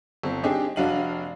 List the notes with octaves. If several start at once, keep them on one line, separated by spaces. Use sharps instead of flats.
G1 C4
C4 D4 D#4 G4 G#4
F1 D4 F#4 F5 D#7 F#7